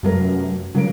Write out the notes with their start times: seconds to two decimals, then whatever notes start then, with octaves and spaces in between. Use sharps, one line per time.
0.03 F1 F#2 F#3 A#4
0.75 C#3 F#3 A#3 D7